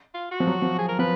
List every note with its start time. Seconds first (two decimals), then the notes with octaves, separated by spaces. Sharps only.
0.14 F4
0.31 F#4
0.40 F3
0.47 F#3
0.62 F3
0.78 G#4
0.88 A#4
0.99 F3 B4